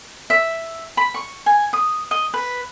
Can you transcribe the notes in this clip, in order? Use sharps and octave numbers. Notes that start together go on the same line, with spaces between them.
E5
B5
C#6
G#5
D#6
D#5
B4